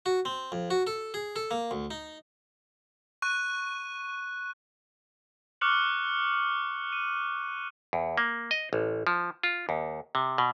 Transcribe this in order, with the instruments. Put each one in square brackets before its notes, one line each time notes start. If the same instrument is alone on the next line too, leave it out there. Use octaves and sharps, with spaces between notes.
[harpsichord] F#4
C4
F2
F#4
A4
G#4
A4
A#3
D2
D#4
[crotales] C#6 F#6 D#7
C#6 D6 F6 F#6 C#7 F#7
D#7
[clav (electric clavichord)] E2
A#3
D#5
A1
F3
F4
D#2
C3
B2